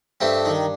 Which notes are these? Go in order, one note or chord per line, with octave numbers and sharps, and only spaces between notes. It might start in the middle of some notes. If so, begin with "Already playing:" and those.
G2 A3 C4
D#3